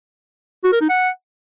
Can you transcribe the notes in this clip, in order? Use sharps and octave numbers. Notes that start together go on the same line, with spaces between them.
F#4
A#4
D#4
F#5